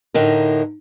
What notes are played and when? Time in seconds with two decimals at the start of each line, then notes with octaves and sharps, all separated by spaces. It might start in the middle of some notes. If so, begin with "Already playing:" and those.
0.14 A2 D3 D#4 A#4